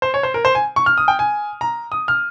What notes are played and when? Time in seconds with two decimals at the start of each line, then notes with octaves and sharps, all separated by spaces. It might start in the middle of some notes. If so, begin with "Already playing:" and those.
0.02 C5
0.14 C#5
0.23 C5
0.34 A#4
0.45 C5
0.55 G#5
0.76 C#6
0.86 F6
0.98 D#6
1.08 G5
1.19 G#5
1.61 A#5
1.92 D#6
2.08 F6